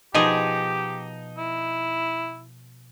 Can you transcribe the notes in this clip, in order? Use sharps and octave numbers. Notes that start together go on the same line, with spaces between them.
B2 F3 D#4 G4 G#4
E4